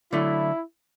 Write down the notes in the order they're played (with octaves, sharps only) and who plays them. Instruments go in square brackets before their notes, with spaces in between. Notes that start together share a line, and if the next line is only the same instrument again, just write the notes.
[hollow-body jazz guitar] D3 F#3 A3 [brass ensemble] E4